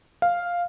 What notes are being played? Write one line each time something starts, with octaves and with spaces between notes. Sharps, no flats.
F5